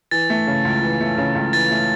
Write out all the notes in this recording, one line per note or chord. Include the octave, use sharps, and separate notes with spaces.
E3 A6
A3
C#3
C#2
E3
A3
C#3
C#2
E3 A6
A3